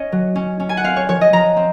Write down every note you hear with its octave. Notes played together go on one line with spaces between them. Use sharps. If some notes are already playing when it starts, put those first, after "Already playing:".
Already playing: C#4 C#5 D#5
F#3
C#4
C#4
G#5
F#5
C4 F5
C#5
F3 C#5
D#5
F3 A#5
C4